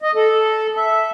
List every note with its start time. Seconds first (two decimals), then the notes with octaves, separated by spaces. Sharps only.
0.02 D#5
0.15 A4
0.77 E5